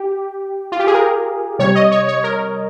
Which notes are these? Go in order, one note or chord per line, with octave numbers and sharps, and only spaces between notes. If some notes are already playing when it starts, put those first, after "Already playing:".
Already playing: G4
F4
G4
G#4
A#4
C3 G3 C#5
D#5
C#5
C#5
A#4